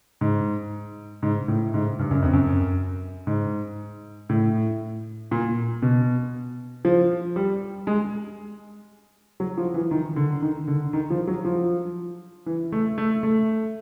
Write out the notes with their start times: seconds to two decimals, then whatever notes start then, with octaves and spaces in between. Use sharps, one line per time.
0.21 G#2
1.23 G#2
1.48 A2
1.74 G#2
1.99 G2
2.11 F#2
2.22 F2
2.33 F#2
3.27 G#2
4.29 A2
5.31 A#2
5.82 B2
6.85 F3
7.36 G3
7.87 G#3
9.40 F#3
9.57 F3
9.74 E3
9.91 D#3
10.16 D3
10.42 D#3
10.68 D3
10.93 D#3
11.10 F3
11.27 F#3
11.45 F3
12.46 E3
12.72 A3
12.98 A3
13.23 A3